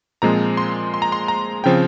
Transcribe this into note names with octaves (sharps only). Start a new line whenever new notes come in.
A#2 F3 G#3 C4 A#5
C6
C6
A#5
C6
A#5
C#3 F3 C4 G5